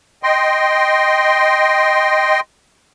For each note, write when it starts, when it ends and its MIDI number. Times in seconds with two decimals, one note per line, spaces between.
0.23 2.40 75
0.23 2.40 79
0.23 2.40 84